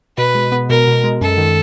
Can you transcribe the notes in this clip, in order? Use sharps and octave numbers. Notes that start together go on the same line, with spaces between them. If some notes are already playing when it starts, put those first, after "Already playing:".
B2 B4
G#3
B3
B2 A#4
B2
G#3
F#2 A4
D#3